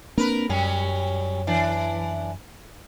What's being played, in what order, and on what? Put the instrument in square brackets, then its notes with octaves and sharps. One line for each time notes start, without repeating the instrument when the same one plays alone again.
[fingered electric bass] A#3 C4 D4 [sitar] A#4 B4
[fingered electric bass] F#2 [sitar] F#3 G3 C#4
[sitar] E3 D4